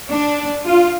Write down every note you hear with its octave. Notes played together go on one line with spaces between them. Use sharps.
D4
F4